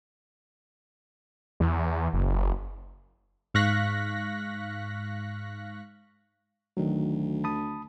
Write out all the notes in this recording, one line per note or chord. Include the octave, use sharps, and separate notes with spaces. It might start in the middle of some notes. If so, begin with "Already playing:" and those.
E2
F#1
G#2 F5 C#6 F#6 A#6 B6
D2 D#3 F#3
A5 B5 D#6